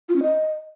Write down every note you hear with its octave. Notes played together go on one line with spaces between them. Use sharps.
F4
C#4
D#5